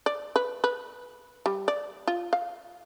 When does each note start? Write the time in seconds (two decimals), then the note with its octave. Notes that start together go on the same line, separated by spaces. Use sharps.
0.06 D5
0.36 B4
0.64 B4
1.46 G3
1.68 D5
2.08 F4
2.33 F5